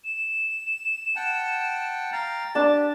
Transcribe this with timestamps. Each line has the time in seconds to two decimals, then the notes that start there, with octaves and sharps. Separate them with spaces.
0.04 E7
1.16 F#5 G5 A5
2.13 F5 G5 A#5 A6
2.55 D4 G4 A5